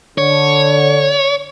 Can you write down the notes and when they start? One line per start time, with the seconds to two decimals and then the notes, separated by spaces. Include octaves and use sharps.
0.18 D3 C#5